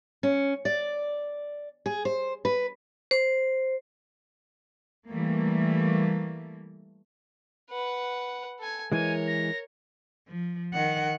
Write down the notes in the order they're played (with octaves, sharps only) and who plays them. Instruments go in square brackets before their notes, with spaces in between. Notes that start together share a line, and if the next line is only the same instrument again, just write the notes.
[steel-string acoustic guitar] C#4
D5
G#4
C5
B4
[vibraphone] C5
[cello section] E3 G3 A3 A#3
[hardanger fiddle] B4 F#5
A4 G#5
[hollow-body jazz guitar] E3 G#3 [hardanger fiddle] A#4 C#5 [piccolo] G#5
[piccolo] A#6
[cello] F3
D#3 F#5